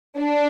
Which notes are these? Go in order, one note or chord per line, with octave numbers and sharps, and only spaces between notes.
D4